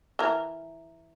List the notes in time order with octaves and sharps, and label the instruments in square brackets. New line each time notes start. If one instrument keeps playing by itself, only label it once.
[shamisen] E3 A#4